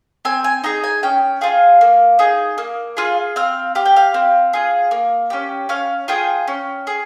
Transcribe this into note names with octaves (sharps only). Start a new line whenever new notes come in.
C4 G#5
G#5
D#4 G#4 A#5
G#5
C#4 G5
F4 G#4 F5
A#3
D#4 G#4
A#3
F4 G#4
C4 F5
G4 F5
G5
F5
C4
F4 G#4
A#3
C#4 G4
C#4 F5
F4 G#4 G5
C#4
G#4